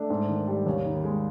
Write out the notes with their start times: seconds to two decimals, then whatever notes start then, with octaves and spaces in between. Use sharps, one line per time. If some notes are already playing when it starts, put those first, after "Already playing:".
Already playing: A3 D4
0.10 G#2
0.29 D#3
0.47 G3
0.66 D#2 C#4
0.85 D#3
1.04 G#3